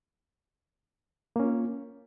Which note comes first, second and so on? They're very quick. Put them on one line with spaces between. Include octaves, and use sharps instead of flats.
A#3 C#4 F4